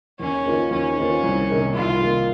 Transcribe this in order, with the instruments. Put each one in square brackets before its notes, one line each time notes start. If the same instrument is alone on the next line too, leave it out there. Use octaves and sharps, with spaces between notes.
[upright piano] D#2 [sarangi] C#4
[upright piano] D#3 A#3 F4 C5
[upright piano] D#2 [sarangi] C#4
[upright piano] D#3 A#3 F4 C5
C2
C3 D#3 A#3
[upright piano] C2 [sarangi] F4
[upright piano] C3 D#3 A#3